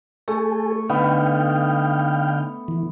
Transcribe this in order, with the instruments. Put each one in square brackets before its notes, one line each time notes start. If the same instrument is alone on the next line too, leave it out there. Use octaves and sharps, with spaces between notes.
[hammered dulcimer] A3 [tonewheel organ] G#4 A4
[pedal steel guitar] D3 D#4 [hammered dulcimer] B3 E5 [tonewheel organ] F5 G5
[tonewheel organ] E3